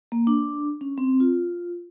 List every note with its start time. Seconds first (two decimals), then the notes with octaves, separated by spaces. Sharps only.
0.12 A#3
0.27 D4
0.81 C#4
0.98 C4
1.20 F4